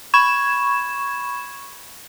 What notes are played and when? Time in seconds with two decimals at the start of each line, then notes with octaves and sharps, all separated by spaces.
0.14 B5 C#6 G#6 E7